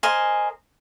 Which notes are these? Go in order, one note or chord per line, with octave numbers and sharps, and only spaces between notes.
A#4 C5 D#5 G#5